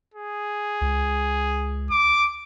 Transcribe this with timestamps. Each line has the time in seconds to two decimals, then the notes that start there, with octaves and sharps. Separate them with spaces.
0.14 G#4
0.81 C#2
1.91 D6